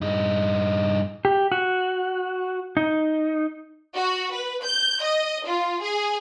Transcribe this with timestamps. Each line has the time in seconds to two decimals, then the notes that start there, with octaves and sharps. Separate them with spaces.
0.01 G2 D#4
1.25 G4
1.52 F#4
2.77 D#4
3.96 F#4
4.32 B4
4.64 G6
5.02 D#5
5.47 F4
5.83 G#4